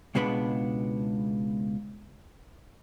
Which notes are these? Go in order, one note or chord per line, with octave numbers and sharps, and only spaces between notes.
C#2 B2 G#3 B3 D4 B5